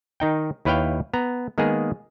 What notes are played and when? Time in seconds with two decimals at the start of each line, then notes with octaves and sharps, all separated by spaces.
0.20 D#3 D#4 G5
0.65 D#2 E4 B4 C#5 F5 G5
1.14 B3 A#5
1.58 D#3 G#3 A#3 B3 G#4